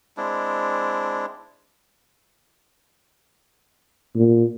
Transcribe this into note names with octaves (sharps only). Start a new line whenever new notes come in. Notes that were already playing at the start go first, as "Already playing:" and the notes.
G#3 C4 D4 E4
A#2